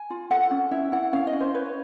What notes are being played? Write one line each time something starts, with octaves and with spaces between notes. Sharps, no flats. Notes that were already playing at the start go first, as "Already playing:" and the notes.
Already playing: G#5
F4
A4 F#5
C#4
E4 E5
E4 F#5
C#4 F5
D#5
C#4
C5
B4 C#5